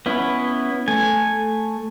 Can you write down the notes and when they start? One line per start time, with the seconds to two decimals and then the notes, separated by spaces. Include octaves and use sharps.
0.06 B3 C#4 E4
0.88 A3 G#5